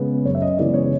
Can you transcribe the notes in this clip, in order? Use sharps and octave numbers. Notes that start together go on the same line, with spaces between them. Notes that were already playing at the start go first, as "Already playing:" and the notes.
Already playing: C#3 G#3 B3
F#2 C#5
E5
D#5
C#3 E3 G#3 B3 D5
C#5